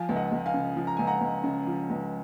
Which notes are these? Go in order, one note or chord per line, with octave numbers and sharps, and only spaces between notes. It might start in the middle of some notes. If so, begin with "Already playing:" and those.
Already playing: F3 F5 G#5
C#2
D#5 F#5
C#2
F5 G#5
C#3
F3
A#5
C#2 G#5
F#5 A#5
C#2
C#3
F3
C#2